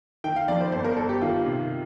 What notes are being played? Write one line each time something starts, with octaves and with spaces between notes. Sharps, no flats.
D#3 G5
F5
F2 D5
C5
G1 C5
A#4
G1 A4
G4
D#3 F4
C3